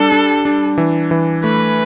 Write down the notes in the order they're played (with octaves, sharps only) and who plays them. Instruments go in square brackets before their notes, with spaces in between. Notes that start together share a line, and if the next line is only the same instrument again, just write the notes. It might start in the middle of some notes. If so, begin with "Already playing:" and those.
Already playing: [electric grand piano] G3 D4 [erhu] A4
[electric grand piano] D4
D4
E3
E3
[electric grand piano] A3 [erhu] B4